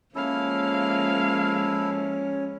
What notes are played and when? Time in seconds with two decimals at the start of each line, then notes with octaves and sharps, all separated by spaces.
0.15 F3 G#3 A#3 C#4 E4 A4 F5